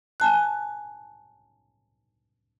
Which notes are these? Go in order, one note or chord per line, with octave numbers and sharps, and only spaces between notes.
G#5 A5 F#6